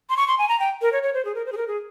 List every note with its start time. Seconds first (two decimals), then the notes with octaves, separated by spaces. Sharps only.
0.10 C6
0.17 C#6
0.28 C6
0.39 G#5
0.49 A#5
0.60 G5
0.82 A#4
0.93 C#5
1.03 C#5
1.14 C5
1.25 G#4
1.35 A#4
1.46 C5
1.52 G#4
1.57 A#4
1.68 G#4